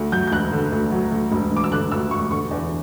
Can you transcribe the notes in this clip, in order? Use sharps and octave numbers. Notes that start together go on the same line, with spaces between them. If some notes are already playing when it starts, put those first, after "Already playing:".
Already playing: D2
F#3 G6
G6
E1 F#6
D3
D2
F#3
D2
E1
E1 D6
E6
D3 F#6
D2 E6
E1 C#6
D3 C#6
E2